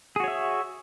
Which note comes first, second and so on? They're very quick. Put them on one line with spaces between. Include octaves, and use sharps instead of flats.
G#4 F#4 C#5 E5